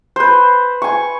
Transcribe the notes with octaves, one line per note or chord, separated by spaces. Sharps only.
B4 C5
G#5 C#6